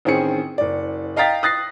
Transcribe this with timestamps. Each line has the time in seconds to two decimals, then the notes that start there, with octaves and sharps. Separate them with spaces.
0.05 A1 D#3 C4 C#4 G#4 C#7
0.58 F#1 D5
1.16 D#5 F5 G5 A#5 A6 B6
1.43 D#6 F#6 A6 A#6 C7